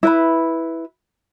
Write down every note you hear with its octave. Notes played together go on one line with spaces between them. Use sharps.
E4 B4 B5